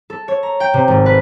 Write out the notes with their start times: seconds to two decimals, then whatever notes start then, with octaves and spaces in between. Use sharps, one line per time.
0.10 A4
0.28 C#5
0.43 A#5
0.60 G5
0.74 C3
0.88 G#1
1.06 B4